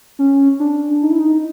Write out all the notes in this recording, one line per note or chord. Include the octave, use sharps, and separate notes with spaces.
C#4
D4
D#4
E4
D#4